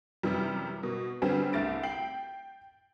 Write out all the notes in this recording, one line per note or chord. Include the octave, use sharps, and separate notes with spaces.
F#2 C3 E3 G3
B2
D3 G3 B3 C4 G#4
C2 A3 A6 D7
G5 C7 F#7